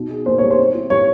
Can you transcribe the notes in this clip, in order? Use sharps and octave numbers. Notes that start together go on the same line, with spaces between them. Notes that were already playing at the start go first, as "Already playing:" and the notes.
Already playing: B2 D#4
G#4
A#3 C5
G3 C#5
C5
C4
E4
G3 C#5